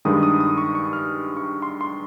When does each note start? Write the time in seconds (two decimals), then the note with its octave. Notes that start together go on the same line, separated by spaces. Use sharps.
0.05 G2 D#3 G#3 D#6
0.23 D#6
0.40 D#6
0.58 C#6
0.75 C#6
0.93 F6
1.37 C#6
1.62 C6
1.81 C6